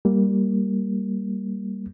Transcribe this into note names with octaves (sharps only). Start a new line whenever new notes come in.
G3 A#3